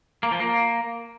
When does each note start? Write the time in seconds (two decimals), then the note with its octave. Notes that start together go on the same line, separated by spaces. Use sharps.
0.23 A#3
0.32 F3
0.40 A#3